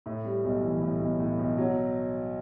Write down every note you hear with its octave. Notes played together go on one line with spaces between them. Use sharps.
A2
G3
B1
E3
A2
B1
A2
B1
F#3